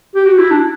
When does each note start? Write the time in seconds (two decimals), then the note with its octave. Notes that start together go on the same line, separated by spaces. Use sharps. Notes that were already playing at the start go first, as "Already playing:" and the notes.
0.15 G4
0.26 F#4
0.38 E4
0.50 D4